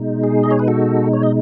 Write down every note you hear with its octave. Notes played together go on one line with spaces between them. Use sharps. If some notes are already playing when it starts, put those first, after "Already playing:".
Already playing: B2 G#3 D#4
G#4
D#5
C#5
B4
F#4 A4
C#5
D#5